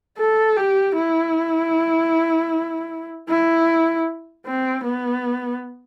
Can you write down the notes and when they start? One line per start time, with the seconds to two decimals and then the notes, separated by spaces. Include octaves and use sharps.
0.18 A4
0.57 G4
0.96 E4
3.29 E4
4.46 C4
4.85 B3